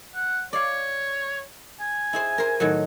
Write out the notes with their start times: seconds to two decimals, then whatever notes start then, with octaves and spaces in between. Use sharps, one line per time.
0.15 F#5
0.53 C#5 D5 F5
1.79 G#5
2.13 E4 G#4 C5
2.38 A#4 C5
2.60 A2 D#3 F#3